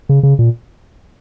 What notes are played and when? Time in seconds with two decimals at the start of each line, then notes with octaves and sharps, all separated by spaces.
0.09 C#3
0.23 C#3
0.39 A#2